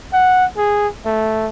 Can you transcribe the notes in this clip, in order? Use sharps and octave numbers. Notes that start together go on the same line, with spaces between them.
F#5
G#4
A3